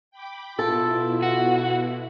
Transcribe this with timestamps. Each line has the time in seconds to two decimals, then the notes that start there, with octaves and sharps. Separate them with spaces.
0.11 G5 B5 D6
0.59 B2 E4 F4 A4
1.23 F#4